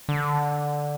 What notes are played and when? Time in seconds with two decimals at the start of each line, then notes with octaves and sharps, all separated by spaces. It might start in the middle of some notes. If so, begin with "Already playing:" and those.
0.09 D3